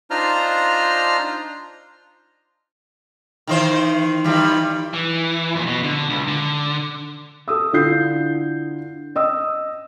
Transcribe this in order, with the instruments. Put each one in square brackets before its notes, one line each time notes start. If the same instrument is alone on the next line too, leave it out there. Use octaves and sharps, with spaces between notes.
[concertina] D4 D#4 F4 C5 A#5 F6
[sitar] D#3 E3 C5
D#3 E3 G3
[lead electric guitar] E3
F2 A#2
B2
D3
C#2
D3
[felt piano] A4 D#6 E6
D3 E4 F4 G6 C7
D#5 D#6 E6